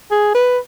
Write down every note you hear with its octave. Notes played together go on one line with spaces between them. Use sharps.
G#4
B4